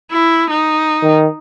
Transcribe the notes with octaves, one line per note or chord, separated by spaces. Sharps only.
E4
D#4
D#3